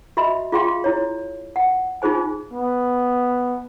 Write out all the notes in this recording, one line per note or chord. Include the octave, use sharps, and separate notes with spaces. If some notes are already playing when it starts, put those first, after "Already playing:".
F#4 D#5 E5 B5
F4 G#4 F5 G5 C6
E4 C#5
F#5
D#4 F4 G#4 C5 G#5
B3